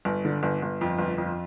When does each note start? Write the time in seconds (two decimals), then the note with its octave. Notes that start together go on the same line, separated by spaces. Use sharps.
0.05 G1
0.25 D3
0.43 G1
0.62 G1
0.81 F2
0.99 G1
1.18 F2